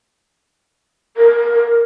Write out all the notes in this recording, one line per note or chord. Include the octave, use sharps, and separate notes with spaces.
A#4